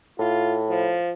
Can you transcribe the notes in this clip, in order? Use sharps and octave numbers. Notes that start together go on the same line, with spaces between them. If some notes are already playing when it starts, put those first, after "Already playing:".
A2 F4
F3